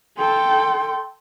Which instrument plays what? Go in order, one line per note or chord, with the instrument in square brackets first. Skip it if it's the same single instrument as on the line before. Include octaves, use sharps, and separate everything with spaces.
[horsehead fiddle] A4 G5 [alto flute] C6